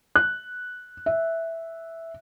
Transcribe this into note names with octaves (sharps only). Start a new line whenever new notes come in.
F#6
E5